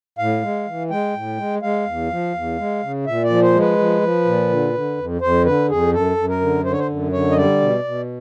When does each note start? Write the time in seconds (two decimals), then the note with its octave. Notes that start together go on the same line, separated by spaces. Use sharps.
0.18 A2 F5
0.42 G#3
0.67 E3
0.90 G#3 G5
1.14 A2
1.38 G#3
1.62 G#3 F5
1.86 E2
2.10 F3
2.34 E2
2.58 G#3
2.82 C#3
3.06 A#2 E5
3.24 D5
3.30 F3
3.42 C5
3.54 G#3
3.60 B4
3.78 F3
4.02 F3
4.25 A#2
4.49 D3
4.73 D3
4.98 F2
5.21 F2 C5
5.45 D3 B4
5.69 F2 G#4
5.92 F#2 A4
6.17 F#2
6.29 A#4
6.41 D3
6.64 D3 C5
6.72 C#5
6.78 C5
6.88 F#2
7.12 D3 C#5
7.31 D#5
7.37 G3 D5
7.61 B2
7.84 B2